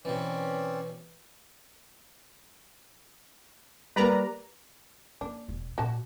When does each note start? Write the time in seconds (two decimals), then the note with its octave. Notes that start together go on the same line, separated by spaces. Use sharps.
0.05 B2 E3 C4 C#4 D5
3.96 G3 A#3 B4 D5 A#5
5.21 A#3 D4
5.48 E1
5.78 A#2 F#4 A5